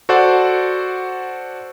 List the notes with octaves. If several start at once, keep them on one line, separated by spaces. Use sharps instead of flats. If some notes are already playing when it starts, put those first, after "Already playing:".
F#4 A4 C5 D5 F#5